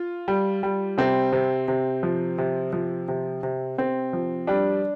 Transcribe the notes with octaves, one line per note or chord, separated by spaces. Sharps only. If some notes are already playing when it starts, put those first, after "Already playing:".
Already playing: F4
G3
G3
C3 C4
C3
C3
F3
C3
F3
C3
C3
C3 C4
F3
G3 D4